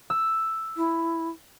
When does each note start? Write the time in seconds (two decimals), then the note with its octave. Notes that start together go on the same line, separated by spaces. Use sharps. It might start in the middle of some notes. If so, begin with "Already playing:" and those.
0.10 E6
0.77 E4